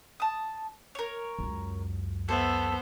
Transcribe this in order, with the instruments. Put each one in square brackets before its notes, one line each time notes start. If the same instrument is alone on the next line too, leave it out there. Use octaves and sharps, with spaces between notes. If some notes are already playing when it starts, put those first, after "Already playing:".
[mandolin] A5 D#6
A#4 C#5
[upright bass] C#2 F#2
[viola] B3 C5 [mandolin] A4 E5